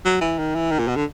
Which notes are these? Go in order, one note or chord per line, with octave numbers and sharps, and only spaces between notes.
F#3
E3
D#3
E3
D#3
A#2
B2
D3